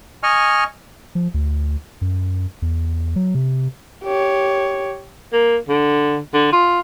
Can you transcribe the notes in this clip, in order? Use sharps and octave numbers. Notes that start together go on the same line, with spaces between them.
D#5 G#5 C#6 F6
F3
D2
F#2
E2
F#3
C3
G4 C#5
A#3
D3
D3
F4